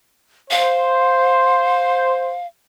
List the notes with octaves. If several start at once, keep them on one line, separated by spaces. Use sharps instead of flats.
C5 F5